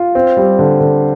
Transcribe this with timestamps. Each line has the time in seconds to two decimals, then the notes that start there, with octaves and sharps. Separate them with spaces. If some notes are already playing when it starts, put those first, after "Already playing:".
Already playing: F4
0.15 C4
0.37 G3
0.59 D3
0.80 D3